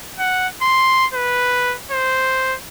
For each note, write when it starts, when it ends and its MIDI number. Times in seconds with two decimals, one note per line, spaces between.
0.19 0.47 78
0.62 1.06 84
1.14 1.76 71
1.91 2.55 72